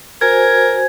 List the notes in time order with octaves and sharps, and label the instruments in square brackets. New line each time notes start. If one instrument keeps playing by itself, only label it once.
[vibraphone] F#4 C5 G#5 [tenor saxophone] A#4 [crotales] G#6